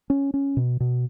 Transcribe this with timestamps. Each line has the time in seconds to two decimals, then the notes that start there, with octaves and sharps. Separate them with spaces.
0.10 C#4
0.34 C#4
0.57 B2
0.80 B2